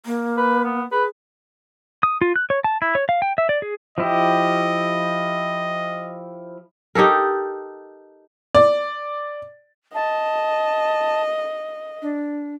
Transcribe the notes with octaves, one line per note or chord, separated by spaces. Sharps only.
A#3
B4
B3
G#4 B4
D#6
F4
F#6
C#5
A5
E4
C#5
F5
G5
E5
D5
G#4
F3 E4 G4 D#5
D#4 G4 A4 A#4
D5
D#5 A5
D4